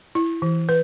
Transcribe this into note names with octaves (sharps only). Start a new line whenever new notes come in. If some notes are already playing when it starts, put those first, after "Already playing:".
E4
E3
B4